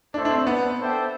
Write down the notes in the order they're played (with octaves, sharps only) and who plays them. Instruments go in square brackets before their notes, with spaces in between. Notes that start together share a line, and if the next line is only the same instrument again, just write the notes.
[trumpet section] A3 E4 A4 C5 [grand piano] D4
[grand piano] D4
C4
B3
[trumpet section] D4 A4 C5 E5 G5